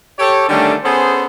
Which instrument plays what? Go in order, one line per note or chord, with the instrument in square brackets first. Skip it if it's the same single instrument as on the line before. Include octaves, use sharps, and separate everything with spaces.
[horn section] G4 A4 C#5
D3 D#3 G3 A3 C#4 D4
B3 C#4 G#4 A4 C5